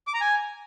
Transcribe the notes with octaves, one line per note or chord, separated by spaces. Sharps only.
D6
A#5
G#5